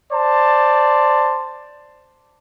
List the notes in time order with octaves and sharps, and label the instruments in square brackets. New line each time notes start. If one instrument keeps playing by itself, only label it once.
[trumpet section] C5 D5 A5